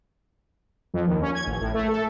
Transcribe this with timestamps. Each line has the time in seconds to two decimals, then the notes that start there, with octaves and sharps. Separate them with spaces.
0.94 F2
1.07 D#2
1.22 C#4
1.35 G#6
1.47 A1
1.61 A2
1.74 A3
1.88 A4